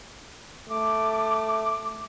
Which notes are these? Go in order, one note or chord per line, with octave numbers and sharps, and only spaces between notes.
A3 D6